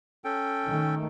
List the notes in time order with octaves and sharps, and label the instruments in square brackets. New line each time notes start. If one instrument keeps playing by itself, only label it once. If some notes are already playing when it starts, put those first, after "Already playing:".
[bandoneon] C#4 A4 G5
[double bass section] D#3 A3